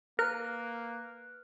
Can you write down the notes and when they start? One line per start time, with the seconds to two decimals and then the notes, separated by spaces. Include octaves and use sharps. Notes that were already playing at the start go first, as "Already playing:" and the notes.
0.19 A#3 A#4 B4 F6 F#6